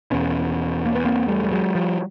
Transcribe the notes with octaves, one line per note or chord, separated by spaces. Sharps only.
E2 B2 B3 C#4
A#3
B3
A#3 C4
G3 A3
G3
F#3 G#3
F3 G3